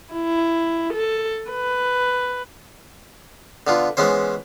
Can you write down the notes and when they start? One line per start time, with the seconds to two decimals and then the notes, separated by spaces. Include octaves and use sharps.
0.12 E4
0.94 A4
1.50 B4
3.67 D3 B3 F4
3.97 E3 G#3 B3 C#4 C5